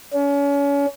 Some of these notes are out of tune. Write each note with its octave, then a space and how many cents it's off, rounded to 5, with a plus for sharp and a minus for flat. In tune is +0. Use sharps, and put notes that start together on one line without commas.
C#4 +35